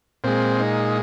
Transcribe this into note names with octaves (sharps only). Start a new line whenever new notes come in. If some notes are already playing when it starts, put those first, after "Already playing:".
A#2 G#3 C4
D#4